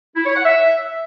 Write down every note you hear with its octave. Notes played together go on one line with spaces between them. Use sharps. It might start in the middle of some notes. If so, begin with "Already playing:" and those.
E4
C#5
F#5
E5